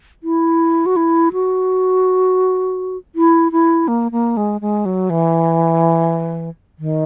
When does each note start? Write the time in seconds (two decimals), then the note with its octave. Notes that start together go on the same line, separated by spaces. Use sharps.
0.23 E4
0.86 F#4
0.96 E4
1.33 F#4
3.15 E4
3.52 E4
3.88 A#3
4.12 A#3
4.37 G#3
4.61 G#3
4.85 F#3
5.10 E3
6.79 D#3